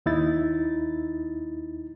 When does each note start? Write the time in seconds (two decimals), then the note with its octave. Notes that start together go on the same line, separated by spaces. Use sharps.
0.06 D#2 D#4 E4 A6